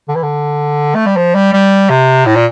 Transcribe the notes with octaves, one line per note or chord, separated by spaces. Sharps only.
D3
E3
D3
A3
G3
F3
G3
G3
C3
A2
A#2